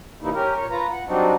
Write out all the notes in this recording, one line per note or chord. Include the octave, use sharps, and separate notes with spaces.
C3 E3 G3 A#3 D#4 E4
C#4 G4 A#4
A#2 C#5
F4 B4 A#5
F#5
F#3 G3 C4 D4 D#4 F#4